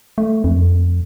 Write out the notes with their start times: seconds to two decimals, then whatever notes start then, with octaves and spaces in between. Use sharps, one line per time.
0.18 A3
0.44 F2